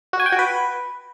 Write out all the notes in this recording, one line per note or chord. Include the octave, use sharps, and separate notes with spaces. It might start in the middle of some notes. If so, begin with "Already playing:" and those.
F#4
G#5
G5
F#4
B4